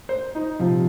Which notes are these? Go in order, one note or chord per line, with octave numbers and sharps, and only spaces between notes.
C5
D#4
C3 F3 F4